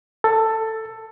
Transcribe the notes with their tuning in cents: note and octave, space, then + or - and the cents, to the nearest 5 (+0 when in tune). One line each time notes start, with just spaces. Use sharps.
A4 +10